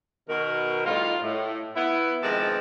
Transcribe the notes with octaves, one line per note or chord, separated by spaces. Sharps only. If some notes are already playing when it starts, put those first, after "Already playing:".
B2 D#3 A#4
A2 G3 D#4 F4
A2
B3 E4
C3 D#3 F3 G#3 B3 A5